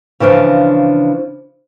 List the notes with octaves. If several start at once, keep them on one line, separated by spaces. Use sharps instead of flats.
C#3 E3 F3 D4 F5